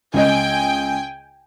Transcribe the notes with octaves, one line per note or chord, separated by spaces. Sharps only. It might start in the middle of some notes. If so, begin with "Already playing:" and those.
C#2 D#5 G5 G#5